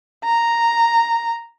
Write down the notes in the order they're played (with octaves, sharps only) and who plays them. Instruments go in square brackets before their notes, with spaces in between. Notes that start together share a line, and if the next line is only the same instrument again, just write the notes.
[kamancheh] A#5